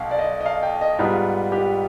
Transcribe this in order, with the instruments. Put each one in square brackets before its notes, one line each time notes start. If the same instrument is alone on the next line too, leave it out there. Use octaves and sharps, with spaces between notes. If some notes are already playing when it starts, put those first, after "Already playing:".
Already playing: [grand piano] B1 B2 F5 G5
D5
D#5
D#5
F5
G5
D#5
G#2 G3 B3 F4
G4